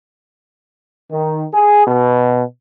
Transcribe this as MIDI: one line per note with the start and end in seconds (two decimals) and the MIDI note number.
1.11 1.43 51
1.53 1.81 68
1.87 2.43 47